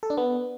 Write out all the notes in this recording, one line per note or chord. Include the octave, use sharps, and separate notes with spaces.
A4
D4
B3